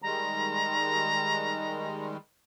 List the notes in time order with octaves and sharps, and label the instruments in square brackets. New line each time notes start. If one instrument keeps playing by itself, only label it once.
[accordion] D#3 G3 G#3 [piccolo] A#5